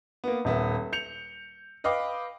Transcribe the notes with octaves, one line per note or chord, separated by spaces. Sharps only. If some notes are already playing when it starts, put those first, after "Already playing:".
A#3 B3
D#1 B3 E5
G6 C#7 F7
B4 D#5 F5 G5 D6